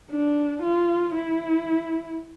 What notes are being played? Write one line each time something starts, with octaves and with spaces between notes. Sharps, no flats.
D4
F4
E4